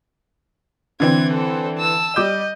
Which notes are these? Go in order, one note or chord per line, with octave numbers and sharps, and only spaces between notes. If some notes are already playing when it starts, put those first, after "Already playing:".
D3 E3 C4 G#6
A4 C5
A5 E6
G3 D#5 D6 G6